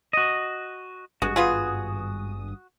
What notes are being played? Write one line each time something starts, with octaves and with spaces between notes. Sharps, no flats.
F#4 D#5
G#1 G2 G#3 F#4 D#6
B3 F4 G#4